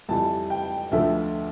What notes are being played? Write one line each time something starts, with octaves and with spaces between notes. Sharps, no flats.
F2 E3 G3 A5
G5
D2 D3 F3 A3 E5